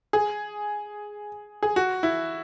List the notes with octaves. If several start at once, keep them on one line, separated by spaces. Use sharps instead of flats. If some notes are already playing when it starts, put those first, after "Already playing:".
G#4
G#4
F#4
E4